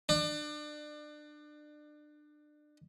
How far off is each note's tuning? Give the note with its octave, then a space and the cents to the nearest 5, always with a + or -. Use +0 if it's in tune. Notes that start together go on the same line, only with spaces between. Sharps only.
D4 +30